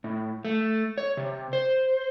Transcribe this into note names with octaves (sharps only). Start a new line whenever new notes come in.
A2
A3
C#5
C3
C5